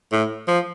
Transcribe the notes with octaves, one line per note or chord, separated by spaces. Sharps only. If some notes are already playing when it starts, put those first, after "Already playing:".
A2
F3